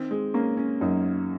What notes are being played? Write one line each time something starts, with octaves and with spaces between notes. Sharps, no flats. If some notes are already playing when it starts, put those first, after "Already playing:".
Already playing: D#3 C4
G#3
A#3 C#4
C#4
F#2 D#4